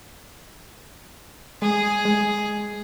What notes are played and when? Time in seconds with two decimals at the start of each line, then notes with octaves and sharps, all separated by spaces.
1.62 G#3 G#4
2.05 G#3